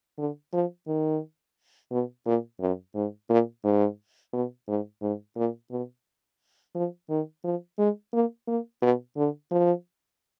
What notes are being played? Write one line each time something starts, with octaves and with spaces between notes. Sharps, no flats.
D3
F3
D#3
B2
A#2
F#2
G#2
A#2
G#2
B2
G#2
G#2
A#2
B2
F3
D#3
F3
G#3
A#3
A#3
B2
D3
F3